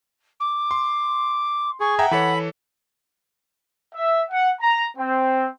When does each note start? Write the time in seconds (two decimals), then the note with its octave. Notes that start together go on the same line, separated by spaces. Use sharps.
0.40 D6
0.71 C6
1.80 G#4 C#6
1.99 E5 F#5 G5 A#5
2.11 E3 A4 C#5 B5
3.94 E5
4.31 F#5
4.60 A#5
4.96 C4